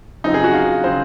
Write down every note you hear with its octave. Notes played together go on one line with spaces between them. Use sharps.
F#2 C#3 F3 C4 D#4
G#4
F#4
F4
C#3 F3 C4 C5